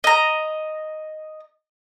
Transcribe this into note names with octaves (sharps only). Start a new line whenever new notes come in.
D#5 A#5